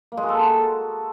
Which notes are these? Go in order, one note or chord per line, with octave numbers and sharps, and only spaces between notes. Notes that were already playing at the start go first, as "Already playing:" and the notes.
A#3
G#3
F#4
A4